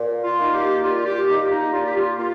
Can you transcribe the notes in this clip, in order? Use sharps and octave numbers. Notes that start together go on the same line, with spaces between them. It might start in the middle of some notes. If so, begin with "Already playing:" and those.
Already playing: A#2
F4
A#3 D#4
G4
A#2 F4
G4
A#3 D#4 G4
D#4
A#2 F4
G4
F4
A#3 F4